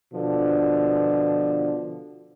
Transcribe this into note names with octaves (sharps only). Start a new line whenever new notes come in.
B2 D3 F3